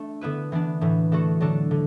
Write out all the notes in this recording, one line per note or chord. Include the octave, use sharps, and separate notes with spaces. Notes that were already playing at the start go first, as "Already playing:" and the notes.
Already playing: A3 D4
D3 B3 E4 B4
E3 B3 D4
A2 E3 B3 E4
D3 A3 F#4 A4
D3 F#3 D4 A4
D3